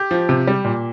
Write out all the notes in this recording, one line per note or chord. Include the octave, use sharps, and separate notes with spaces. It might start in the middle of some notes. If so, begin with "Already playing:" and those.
Already playing: G4
F3
C3
G3
A#2